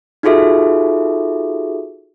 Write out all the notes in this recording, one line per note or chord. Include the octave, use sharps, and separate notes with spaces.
D#4 F4 F#4 G#4 A4 E5